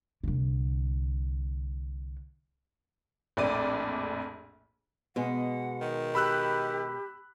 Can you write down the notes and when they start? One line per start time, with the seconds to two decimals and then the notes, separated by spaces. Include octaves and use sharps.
0.23 C2 D3
3.37 A#1 F2 A2 D5 D6 D#7
5.16 B2 G#3 F#5
5.81 D#3
6.15 G4 B5 E6 F#6